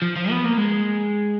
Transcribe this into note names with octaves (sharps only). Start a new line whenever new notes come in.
F3
F3
B3
A#3
G#3